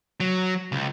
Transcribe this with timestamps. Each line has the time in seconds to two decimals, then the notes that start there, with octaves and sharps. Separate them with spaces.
0.20 F#3
0.72 C#2